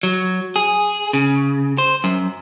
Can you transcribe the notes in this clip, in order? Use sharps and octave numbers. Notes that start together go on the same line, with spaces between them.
F#3
G#4
C#3
C5
F#2